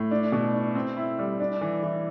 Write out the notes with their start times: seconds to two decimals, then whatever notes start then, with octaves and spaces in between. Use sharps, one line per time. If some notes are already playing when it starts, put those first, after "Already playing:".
Already playing: A2
0.11 D4
0.32 B2
0.54 D4
0.75 C4
0.97 E4
1.19 G3
1.40 D4
1.61 E3
1.83 E3